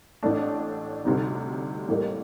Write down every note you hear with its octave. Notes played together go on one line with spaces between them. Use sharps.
A1 A2 A3 D4
D2 C3 G3 C4 D#4
A1 A2 G3 A#3